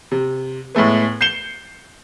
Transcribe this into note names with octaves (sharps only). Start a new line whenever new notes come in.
C3
A2 G#3 A3 B3
G6 C7 C#7 E7 G7